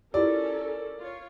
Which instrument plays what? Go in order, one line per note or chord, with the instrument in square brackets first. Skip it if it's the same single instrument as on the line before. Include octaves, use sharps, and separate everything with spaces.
[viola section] C#4 A4 A#4 [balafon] E4 F4 G4 [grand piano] D5
[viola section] F4 C#5